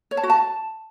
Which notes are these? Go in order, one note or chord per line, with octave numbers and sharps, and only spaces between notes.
C#5
A5
F#4
A5